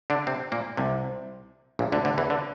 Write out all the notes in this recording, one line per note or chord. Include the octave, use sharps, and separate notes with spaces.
D3 D4
C3 C4
A#2 A#3
C2 C3
A#1 A#2
D2 D3
D2 D3
E2 E3
D3